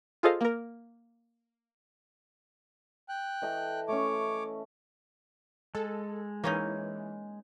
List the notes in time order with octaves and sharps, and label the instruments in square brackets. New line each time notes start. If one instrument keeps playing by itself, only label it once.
[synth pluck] F4 G#4 A4 C5 D#5 F5
A#3 A#4
[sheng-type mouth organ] G5 F#6
[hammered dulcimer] E3 A4 D#5
[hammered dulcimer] A3 C#4 [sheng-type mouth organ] C#5 D6
[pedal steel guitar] G#3 [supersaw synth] A4
[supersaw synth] E3 [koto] A#3 C#4 D#4